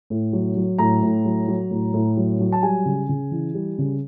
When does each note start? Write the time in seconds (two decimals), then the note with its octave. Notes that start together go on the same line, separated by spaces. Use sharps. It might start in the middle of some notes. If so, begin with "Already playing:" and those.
0.10 A2
0.33 F#3
0.57 F#3
0.78 A2 A#5
1.02 A2
1.25 F#3
1.48 F#3
1.71 A2
1.94 A2
2.17 F#3
2.40 F#3
2.52 A5
2.63 G3 G#5
2.85 C#3
3.09 C#3
3.31 E3
3.54 G3
3.78 C#3